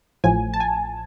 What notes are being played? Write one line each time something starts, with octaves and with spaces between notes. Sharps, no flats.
A1 A2 F3 G#5
A5
G#5